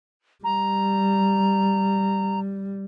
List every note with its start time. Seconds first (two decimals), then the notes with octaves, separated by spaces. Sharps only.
0.44 G3 A#5